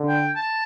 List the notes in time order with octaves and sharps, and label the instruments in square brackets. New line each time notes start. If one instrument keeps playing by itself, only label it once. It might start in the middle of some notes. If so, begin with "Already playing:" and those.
Already playing: [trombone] D3
[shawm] G5
A5